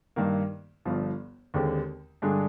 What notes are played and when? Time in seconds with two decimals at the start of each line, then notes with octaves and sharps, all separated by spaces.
0.16 G2 D#3 A#3
0.85 G1 G2 F3
1.54 D#2 D3 G#3 C4 G4
2.22 G2 D3 G#3 D4 G#4